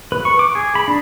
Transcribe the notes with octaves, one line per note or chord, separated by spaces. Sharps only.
B4
C#6
D6
G#4
B5
D4